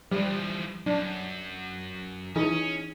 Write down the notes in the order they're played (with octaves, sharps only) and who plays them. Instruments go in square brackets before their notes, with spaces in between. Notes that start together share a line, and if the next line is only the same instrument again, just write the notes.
[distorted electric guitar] E3 F3 [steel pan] G3
[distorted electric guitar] F#2 [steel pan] D4
[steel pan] E3 D#4 G#4 [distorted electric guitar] C#4